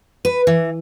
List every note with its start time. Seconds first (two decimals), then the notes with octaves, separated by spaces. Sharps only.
0.25 B4
0.47 E3